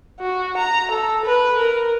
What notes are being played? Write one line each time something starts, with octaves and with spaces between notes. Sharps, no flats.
F#4
A#5
A4
B4
A#4